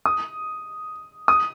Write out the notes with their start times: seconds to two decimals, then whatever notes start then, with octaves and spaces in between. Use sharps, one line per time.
0.06 D#6
1.28 D#6